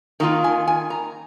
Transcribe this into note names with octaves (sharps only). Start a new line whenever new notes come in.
D#3 A#3 F4 A#5
G#5
G#5
A#5